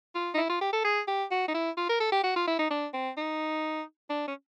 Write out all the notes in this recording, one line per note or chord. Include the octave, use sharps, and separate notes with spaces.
F4
D#4
E4
F4
G4
A4
G#4
G4
F#4
D#4
E4
F4
A#4
A4
G4
F#4
F4
E4
D#4
D4
C4
D#4
D4
C#4